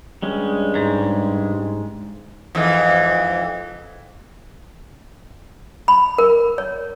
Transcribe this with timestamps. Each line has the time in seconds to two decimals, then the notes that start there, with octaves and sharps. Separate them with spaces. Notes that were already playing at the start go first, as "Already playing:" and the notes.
0.23 G2 G3 G#3 C#4
0.75 G#2
2.55 F2 G#2 E3
5.88 B5
6.18 A#4
6.58 C#5